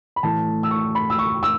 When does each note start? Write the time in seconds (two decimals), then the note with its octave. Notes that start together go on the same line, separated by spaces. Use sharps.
0.16 B5
0.23 A2 E3 A3 A5
0.63 E6
0.71 C#6
0.95 B5
1.10 E6
1.19 C#6
1.43 E6